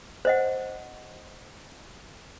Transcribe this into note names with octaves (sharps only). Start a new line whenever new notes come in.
C5 D#5 F#5